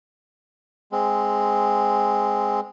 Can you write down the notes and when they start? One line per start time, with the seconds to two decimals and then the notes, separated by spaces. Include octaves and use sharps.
0.92 G#3 C4